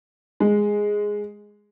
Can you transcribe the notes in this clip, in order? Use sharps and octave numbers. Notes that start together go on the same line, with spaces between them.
G#3